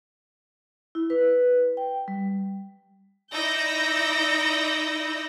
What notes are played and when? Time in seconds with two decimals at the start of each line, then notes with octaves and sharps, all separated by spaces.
0.95 E4
1.10 B4
1.77 G5
2.08 G3
3.32 D#4 E4 D5 E6 G6 A#6